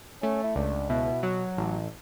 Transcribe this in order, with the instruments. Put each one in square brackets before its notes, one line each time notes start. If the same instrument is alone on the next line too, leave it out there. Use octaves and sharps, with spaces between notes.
[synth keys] A3 [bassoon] C#4
[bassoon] E4
[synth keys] C#2 [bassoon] D4
[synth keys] B2 [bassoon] E4
[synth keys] F#3
A1